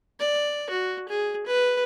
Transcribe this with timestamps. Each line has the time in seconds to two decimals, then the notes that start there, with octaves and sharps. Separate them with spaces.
0.20 D5
0.70 F#4
1.09 G#4
1.46 B4